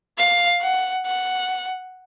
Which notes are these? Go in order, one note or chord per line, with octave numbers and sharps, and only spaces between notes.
F5
F#5
F#5